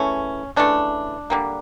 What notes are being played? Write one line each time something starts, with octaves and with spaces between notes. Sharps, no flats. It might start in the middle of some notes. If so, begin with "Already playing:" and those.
Already playing: C#3 E3 A3 C#4
C#3 E3 A3 D4
D3 G3 A#3